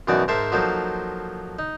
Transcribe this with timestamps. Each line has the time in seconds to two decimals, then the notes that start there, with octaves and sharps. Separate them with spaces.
0.07 F#2 B2 E3 D#4 F#4 D5
0.28 G#2 A#4 C5 E5 A5 C6
0.52 F3 F#3 A#3 D#4 A4 C5
1.59 D#4